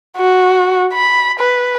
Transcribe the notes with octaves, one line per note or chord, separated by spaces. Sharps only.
F#4
B5
B4